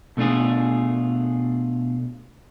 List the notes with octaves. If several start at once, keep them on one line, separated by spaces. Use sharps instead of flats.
B2 A3 D4 F4 G#4